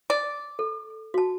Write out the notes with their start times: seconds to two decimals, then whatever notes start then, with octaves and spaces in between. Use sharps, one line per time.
0.10 D5
0.59 A4
1.14 F#4 A5